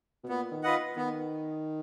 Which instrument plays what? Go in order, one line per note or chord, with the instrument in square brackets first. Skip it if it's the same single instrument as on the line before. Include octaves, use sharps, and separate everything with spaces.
[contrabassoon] B2
[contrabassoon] A#2 [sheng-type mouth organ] B3
[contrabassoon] D#3
[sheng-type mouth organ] F4 B4 D#5 F#5
[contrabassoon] D#3 [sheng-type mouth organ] B3